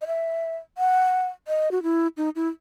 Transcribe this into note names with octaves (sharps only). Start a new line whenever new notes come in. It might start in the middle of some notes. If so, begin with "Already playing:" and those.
D#5
E5
F#5
D#5
F#4
E4
D#4
E4